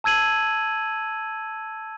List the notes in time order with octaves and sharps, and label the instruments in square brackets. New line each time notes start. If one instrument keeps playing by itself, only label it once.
[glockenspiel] A5 E6 G#6 D#7 F#7